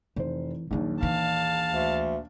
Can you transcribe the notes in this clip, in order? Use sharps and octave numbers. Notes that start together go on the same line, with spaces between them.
F1 E3 C5
A#1 D#2 D#3 F#3
E3 F5 A5
D2